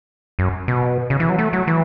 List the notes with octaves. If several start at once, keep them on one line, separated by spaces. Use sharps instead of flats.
F#2
B2
C#3
E3
F#3
A3
F#3
E3